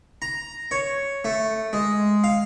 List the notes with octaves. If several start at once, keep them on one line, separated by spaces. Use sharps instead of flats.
A#5
C#5
A3
G#3
F5